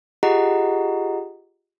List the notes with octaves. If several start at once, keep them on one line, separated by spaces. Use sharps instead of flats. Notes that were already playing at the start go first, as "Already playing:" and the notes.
F4 G4 G#4 D#5 F#5 A#5